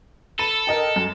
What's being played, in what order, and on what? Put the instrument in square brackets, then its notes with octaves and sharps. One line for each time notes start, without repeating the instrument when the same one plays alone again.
[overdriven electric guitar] A4 [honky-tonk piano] B5 D#7
[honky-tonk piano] A#4 D#5 G5
F#2